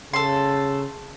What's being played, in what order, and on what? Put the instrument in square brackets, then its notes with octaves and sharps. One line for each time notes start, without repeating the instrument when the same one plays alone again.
[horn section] C#3 [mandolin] A4 C6